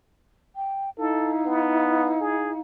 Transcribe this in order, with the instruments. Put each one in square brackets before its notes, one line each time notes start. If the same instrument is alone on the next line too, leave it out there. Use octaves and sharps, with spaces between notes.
[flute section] G5
[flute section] D#4 E4 F5 [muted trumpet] A4
[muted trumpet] B3
G#4